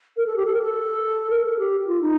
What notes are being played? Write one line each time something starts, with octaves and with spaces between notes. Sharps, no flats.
A#4
A4
G4
A4
A#4
A4
A#4
A4
G4
G4
F4
D#4